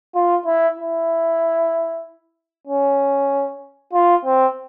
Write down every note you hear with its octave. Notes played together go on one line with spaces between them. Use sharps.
F4
E4
E4
C#4
F4
C4